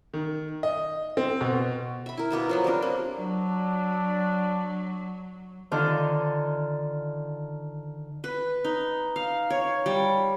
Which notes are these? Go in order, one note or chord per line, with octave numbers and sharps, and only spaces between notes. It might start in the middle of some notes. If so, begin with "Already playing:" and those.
D#3
D#5
C4
B2
E5 B5
E4 A#4
B2 A#3 B3 E5
F3 F#3 B3
G3 C4 D4 A#4
A#3
F#3 D4
D3 D#3 D4 F4 C5
B4
D#4
F5
C#5
G3